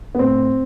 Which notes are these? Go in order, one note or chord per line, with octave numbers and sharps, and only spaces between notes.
B3
A2 C4